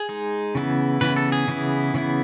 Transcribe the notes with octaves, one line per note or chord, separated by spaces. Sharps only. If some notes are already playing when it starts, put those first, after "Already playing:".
Already playing: G#4
G#3 D#4
C#3 E3 B3 E4
C#3 E3 B3 E4 B4
A4
G#4
C#3 E3 B3 E4
C#3 E3 B3 E4